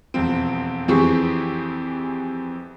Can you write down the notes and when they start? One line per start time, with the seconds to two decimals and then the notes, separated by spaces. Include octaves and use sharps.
0.14 E1 F2 C4
0.88 F2 E3 C4 G4 G#4 C#6